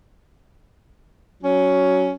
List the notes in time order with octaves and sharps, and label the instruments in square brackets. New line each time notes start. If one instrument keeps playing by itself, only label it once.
[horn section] F#3 C#4